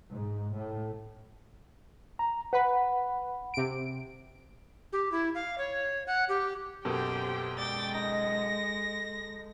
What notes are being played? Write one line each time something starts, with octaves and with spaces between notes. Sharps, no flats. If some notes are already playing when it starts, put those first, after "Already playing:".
G#2
A2
A#5
B4 F#5 B5
C3 D7
G4
E4
F5
C#5
F#5
G4
F#2 B2 A#3 G4 A4 C5 G5
G#3 D5 G5 A6
D#4 A#6